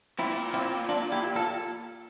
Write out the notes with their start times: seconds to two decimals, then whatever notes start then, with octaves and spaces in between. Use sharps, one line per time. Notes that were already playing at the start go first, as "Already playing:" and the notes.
0.18 A#2 C4 E4
0.54 C4 E4
0.89 D4 F4
1.12 E4 G4
1.36 F4 A4